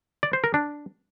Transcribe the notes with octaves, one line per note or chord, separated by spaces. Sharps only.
D5
C5
A#4
D4